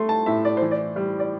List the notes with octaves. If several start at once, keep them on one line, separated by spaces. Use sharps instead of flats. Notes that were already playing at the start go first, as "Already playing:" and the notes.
Already playing: A3 C6
A5
A2 E5
D5
C5
E3
D5
G3
D5